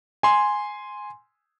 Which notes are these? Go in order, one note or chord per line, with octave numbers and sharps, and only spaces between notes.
G#5 C6